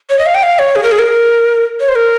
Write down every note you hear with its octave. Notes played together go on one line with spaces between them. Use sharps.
C#5
D#5
F5
G5
F5
C#5
G#4
A#4
G#4
A#4
C#5
C5
A#4